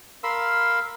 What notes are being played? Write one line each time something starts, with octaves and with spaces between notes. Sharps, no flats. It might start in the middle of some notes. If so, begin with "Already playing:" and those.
A#4 F5 B5 C6 E6